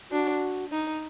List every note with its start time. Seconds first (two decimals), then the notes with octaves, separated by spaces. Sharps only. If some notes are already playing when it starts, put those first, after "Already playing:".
0.11 D4 F#4
0.72 D#4